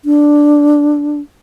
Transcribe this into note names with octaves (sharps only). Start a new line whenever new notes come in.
D4